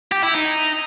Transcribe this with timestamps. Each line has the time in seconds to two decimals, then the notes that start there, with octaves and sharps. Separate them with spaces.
0.12 G4
0.23 E4
0.34 D#4